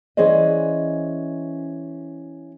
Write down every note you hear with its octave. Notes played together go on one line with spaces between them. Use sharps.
E3 C#4 G#4 C5 D5 D#5